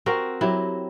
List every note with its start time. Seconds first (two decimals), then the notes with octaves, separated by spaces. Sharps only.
0.06 C4 F#4 A#4
0.41 F#3 E4 G4